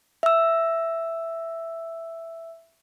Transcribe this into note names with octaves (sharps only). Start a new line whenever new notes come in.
E5 E6